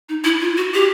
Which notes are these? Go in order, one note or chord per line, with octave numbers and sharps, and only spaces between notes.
D#4
E4
F4
F#4
G4